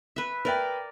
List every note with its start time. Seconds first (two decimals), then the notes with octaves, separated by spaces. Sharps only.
0.16 B4 E5
0.45 A#4 B4 D5 E5 G5